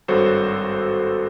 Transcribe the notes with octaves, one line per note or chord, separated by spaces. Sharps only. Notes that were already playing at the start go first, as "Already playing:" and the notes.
G#1 G2 F#4 A4 C5 C#5